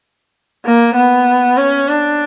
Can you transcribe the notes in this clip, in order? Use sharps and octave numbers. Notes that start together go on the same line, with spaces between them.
A#3
B3
C#4
D4